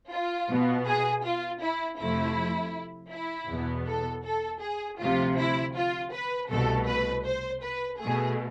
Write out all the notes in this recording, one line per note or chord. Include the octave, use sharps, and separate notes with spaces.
F4
B2 B3
G#4
F4
E4
F2 C3 F3 A3 E4
E4
E2 B2 B3
A4
A4
G#4
D2 C3 F3 F4
E4
F4
B4
C2 B2 A3 A4
B4
C5
B4
B2 A3 G#4